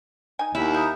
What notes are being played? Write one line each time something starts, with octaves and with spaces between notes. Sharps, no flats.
D#4 G#5
D#2 E4
E5 A#5 D#6 G6